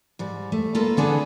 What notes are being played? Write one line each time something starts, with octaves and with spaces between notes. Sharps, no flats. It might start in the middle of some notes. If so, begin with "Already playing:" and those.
G#2 G3
A3
A#3 F4 A4 B4
D3 B3 D4 G#4 A4